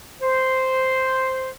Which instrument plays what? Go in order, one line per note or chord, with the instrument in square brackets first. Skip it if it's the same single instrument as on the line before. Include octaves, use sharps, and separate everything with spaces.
[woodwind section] C5